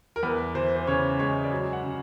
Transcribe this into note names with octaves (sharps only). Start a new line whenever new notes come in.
A#4
E2 B4
E3 C5
C5
C#3 C#5
G#3 C#5
D5
F#2 C#5
F#5
C#3